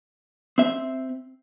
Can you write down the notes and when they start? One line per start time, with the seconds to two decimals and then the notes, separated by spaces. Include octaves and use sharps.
0.58 C4 E5